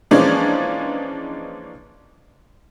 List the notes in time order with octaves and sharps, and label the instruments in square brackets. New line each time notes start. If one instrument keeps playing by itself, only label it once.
[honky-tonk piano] E3 F3 G#3 A#3 C#4 D4